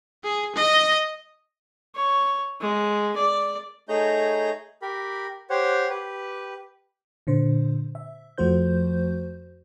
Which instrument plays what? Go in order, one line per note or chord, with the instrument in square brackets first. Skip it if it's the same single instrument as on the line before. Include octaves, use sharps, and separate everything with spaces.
[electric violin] G#4
D#5
[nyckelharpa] C#5
G#3
D5
[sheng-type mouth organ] A3 D#4 G#4 C#5 A#5 G6
G4 A#4 B5
G4 C5 C#5 F#5
G4 B4
[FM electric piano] A#2 D3 C5
E5
F2 F3 A3 F#4 C5 G6